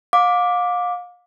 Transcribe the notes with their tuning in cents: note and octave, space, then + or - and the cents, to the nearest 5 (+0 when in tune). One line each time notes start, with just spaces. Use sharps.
F5 +35 D6 +0